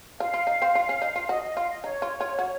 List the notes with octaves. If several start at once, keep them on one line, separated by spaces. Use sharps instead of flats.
F4 F5
F4
D#4
C4
F4
C#4
D#4
F4
F#4 D#5
D#5
F4 F5
D#5
D#4 C#5
F4
F4
F#4